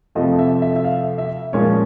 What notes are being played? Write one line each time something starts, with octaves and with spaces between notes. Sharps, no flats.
F2 C3 F3 A3 D#5
E5
E5
E5
F5
E5
A#2 F3 G#3 C#4 C#5